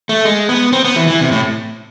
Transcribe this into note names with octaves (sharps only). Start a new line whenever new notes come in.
A3
G#3
B3
C4
B3
E3
E3
C3
A2